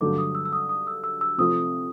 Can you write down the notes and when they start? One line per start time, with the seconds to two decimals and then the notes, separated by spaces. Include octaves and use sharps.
0.01 G2 D3 F#3 A3 D6
0.18 D#6
0.35 E6
0.46 E6
0.53 D#6
0.69 D#6
0.87 E6
1.04 E6
1.21 E6
1.38 C3 F3 A3 C4 F4 D#6